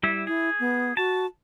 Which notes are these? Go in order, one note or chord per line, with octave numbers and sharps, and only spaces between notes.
G3 E4 E5
E4 G#4
B3
F#4 A5